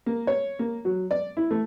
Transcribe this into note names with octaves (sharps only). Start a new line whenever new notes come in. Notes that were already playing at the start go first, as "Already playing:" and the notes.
A#3
C#5
A#3
F#3
D5
E4
A3